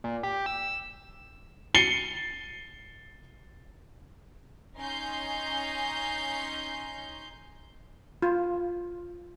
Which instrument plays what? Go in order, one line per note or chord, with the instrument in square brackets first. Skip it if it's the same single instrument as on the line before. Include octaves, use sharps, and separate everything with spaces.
[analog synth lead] A#2
G4
E6
[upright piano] A6 C7 C#7 D#7 G7
[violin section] C#4 D#4 C6 G6
[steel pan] F4